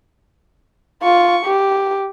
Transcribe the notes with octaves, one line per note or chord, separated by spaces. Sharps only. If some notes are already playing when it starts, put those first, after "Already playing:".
F4 C#6
G4